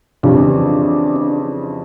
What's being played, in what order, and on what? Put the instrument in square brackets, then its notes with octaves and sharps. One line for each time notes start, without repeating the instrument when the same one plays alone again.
[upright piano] F2 C#3 E3 G3 [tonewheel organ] D4